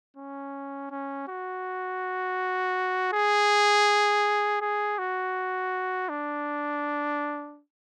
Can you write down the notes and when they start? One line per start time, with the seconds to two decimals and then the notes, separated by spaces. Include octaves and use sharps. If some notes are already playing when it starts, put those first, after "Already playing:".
0.16 C#4
0.91 C#4
1.28 F#4
3.12 G#4
4.61 G#4
4.98 F#4
6.09 D4